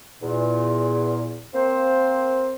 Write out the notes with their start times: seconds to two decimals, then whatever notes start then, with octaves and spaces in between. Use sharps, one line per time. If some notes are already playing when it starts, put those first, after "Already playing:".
0.21 E2 A#2
1.54 A#3 C4 C5